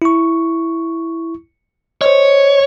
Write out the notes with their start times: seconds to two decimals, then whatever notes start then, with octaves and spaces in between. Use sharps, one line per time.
0.02 E4 C#6
2.01 C5 C#5 D#5